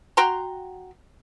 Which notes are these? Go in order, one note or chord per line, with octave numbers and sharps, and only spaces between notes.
F#4 G5 A#5 C6